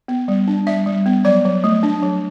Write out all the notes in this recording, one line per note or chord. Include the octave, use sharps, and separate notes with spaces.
B3
G3
D4
G3 E5
G3
B3
F#3 D5
F#3
A3
D4
F#3